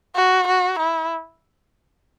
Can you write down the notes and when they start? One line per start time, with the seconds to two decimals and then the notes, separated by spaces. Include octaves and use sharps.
0.16 F#4
0.48 F#4
0.80 E4